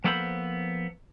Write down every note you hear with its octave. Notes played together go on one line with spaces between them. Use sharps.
F3 A#3 B3 A4 C5 B5